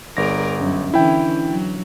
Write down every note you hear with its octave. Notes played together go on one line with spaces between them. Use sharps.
G1 G#4 A#4 D5 A#6
F#2
D3 E3 C#4 E4 G5
F#3